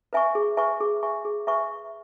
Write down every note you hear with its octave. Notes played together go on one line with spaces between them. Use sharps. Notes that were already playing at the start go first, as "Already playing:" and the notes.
B4 E5 G#5 C#6
G#4
B4 E5 G#5 C#6
G#4
B4 E5 G#5 C#6
G#4
B4 E5 G#5 C#6